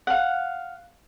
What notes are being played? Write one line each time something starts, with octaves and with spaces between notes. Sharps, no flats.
F5 F#5